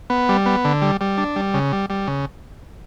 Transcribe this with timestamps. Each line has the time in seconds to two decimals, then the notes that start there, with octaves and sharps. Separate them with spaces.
0.10 B3
0.29 G3
0.46 B3
0.64 D3
0.82 G3
1.01 G3
1.17 D4
1.36 G3
1.54 C#3
1.73 G3
1.90 G3
2.07 C#3